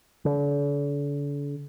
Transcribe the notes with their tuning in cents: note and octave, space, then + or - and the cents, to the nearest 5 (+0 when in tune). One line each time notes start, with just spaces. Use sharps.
D3 -40